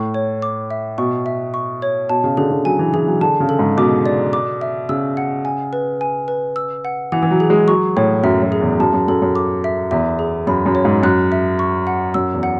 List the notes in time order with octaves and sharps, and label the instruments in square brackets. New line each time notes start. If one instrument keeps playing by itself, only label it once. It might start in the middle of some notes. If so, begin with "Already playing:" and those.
Already playing: [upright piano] A2 [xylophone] C#6
[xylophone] C#5
D6
E5
[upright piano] B2 [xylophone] C#6
[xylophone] E5
C#6
C#5
[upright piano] B2 [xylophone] A5
[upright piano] C#3
[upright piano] D3 [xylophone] G#4
[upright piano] D3
[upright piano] F#3 [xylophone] G#5
[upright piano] E3
[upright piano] E3 [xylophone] G#4
[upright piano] F#3
[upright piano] D3 [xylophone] A5
[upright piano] C#3
[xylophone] A4
[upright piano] G#2
[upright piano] B2 [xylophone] D6
[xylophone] D5
D6
E5
[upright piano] C#3 [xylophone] E6
[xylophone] F#5
G#5
B4
G#5
B4
E6
F#5
[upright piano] E3 [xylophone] F#5
[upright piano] E3
F#3
[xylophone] G#4
[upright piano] G#3
[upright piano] F#3 [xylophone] C#6
[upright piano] A2 [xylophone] C#5
[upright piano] F#2 [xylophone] E5
[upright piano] F#2
[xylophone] G#4
[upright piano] E2
[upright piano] F#2 [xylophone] A5
[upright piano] F#2
[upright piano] F#2 [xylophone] A4
[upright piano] F#2
[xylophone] D6
E5
[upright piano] E2 [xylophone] E5
[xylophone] G#4
[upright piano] F#2 [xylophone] B5
[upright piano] F#2
[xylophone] C#5
[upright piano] G#2
[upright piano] F#2 [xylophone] F#6
[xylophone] E5
C#6
F#5
[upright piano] F#2 [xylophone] E6
[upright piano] E2
[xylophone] F#5